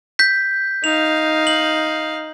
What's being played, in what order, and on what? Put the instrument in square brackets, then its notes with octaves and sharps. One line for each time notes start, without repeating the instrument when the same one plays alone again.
[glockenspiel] G6 B6
[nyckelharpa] D#4 F5 [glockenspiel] F7
[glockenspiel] F#7